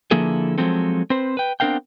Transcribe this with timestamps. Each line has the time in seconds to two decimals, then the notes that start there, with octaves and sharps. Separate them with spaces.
0.11 D3 F3 A#3 E4 G#4 A4
0.58 F3 F#3 G#3 C4 A4
1.10 C4 B4 C5
1.37 B4 G5
1.60 B3 C4 D4 A#4 F5 G5